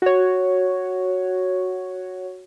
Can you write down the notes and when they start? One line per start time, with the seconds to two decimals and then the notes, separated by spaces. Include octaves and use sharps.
0.02 F#4 C#5